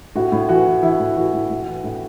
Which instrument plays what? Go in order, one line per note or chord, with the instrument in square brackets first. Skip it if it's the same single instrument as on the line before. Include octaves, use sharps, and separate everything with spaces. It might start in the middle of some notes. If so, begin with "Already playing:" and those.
[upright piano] A2 F#4
A2
E3 F#4
E3
E3 E4
A2
E3 F#4
A2
A2
E3
A2